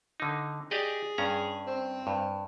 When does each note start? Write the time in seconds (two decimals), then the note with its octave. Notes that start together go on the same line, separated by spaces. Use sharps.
0.20 D3 D#4
0.71 G4 G#4 D5 D#5
1.18 G2 C#4 A#5
1.67 C4
2.07 G2